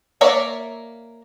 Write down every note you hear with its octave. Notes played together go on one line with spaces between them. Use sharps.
A#3 A#4 C#5 D5 E5